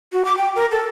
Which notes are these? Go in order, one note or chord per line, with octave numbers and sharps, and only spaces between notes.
F#4
D6
G5
A#4
A4